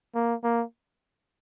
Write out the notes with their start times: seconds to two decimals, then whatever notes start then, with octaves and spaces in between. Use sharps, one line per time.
0.15 A#3
0.43 A#3